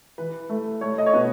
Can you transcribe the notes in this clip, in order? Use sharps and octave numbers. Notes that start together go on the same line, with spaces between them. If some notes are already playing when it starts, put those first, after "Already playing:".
E3 B4
A3
A3 C#5
D#5
C#5
B2 B4